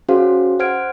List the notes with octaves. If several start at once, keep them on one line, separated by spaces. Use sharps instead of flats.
C#4 F#4 G#4 C5 F5
C5 F#5 F6 G#6 D7